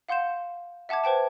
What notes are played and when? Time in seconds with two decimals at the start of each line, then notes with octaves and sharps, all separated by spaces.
0.09 F5 F#5 C6 G6 E7
0.89 E5 F#5 A5 D6 G#6
1.04 B4 C5 G5 A5